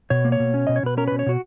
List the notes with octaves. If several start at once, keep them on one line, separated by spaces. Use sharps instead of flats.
B2 C#5
A#3
C#5
B2
C#4
B2 D#5
C#5
B2 B4
C#4 A#4
B2 B4
C#5
B2 F#4